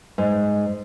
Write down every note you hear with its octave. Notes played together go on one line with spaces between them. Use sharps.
G#2